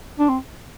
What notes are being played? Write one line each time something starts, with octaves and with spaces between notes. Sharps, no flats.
D4
C4